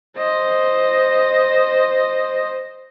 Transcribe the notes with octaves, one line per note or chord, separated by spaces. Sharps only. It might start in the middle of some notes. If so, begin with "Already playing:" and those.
C5 D#5